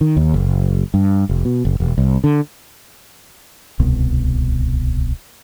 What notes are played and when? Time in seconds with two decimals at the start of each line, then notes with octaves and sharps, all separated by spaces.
0.01 D#3
0.17 D#2
0.34 F#1
0.94 G2
1.29 F1
1.45 B2
1.65 F#1
1.80 E1
1.98 C2
2.24 D3
3.79 D1 C2 B2